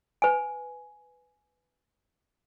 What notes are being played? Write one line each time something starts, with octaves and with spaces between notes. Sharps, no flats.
B4 G#5